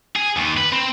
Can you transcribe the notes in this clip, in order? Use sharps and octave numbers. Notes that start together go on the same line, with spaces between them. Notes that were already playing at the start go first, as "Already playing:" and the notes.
G#4
D#2
B4
C4